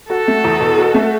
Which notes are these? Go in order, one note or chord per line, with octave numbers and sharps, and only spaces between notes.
F#4 A4
A3
E2
B2
F#4
A3